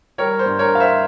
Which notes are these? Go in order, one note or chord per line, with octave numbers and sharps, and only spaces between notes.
G3 A#4 C#5
C5
G2
A#4 C#5
G3 F5
C5 E5